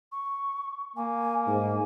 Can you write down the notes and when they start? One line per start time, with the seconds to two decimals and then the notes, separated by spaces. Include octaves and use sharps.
0.12 C#6
0.96 A#3 G#5
1.47 G#2 G#5